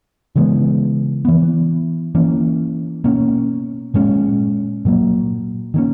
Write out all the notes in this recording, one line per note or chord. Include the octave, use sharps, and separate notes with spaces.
C#3 E3 G#3 B3
E3 B3
E3 A#3 C#4
B2 A#3 C#4
A#2 G#3 C#4
A#2 F#3 A#3
D#3 A#3 C#4